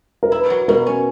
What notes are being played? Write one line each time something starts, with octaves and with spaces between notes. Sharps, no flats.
A#4
E4 B4
F#3
B2 A#4
C#4